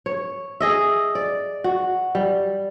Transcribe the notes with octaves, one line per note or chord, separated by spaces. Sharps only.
C#5
G#4 D#5 E5
D5
F#4
G3